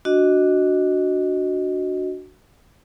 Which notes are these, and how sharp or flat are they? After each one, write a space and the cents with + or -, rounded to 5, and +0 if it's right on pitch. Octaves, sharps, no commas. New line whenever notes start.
D4 +0 F#4 +0 D#5 +0